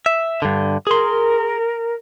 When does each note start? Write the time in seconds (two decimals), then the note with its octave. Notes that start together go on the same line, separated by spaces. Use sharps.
0.06 E5
0.42 G2 D3
0.87 G#4 A#4 C6